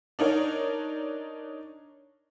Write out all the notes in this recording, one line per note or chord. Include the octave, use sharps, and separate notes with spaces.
D4 D#4 A#4 C#5